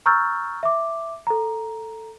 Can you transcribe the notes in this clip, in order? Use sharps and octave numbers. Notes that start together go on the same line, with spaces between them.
A#5 C#6 E6 F6 G6 A6
E5 D6
A4 A#5